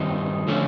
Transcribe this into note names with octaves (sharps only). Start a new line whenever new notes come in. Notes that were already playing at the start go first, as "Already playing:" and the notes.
Already playing: G2 D#3 G3 C4 D#4
D3 F3 A3 C#4